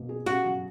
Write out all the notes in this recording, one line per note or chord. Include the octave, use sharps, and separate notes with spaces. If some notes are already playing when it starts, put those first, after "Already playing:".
Already playing: B2 A#3
G#4
C#4 F#4
F#3